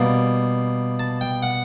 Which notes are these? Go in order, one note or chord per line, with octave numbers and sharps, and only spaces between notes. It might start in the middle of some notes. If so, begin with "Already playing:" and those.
Already playing: B2 G3 A#3
A5
G5
F#5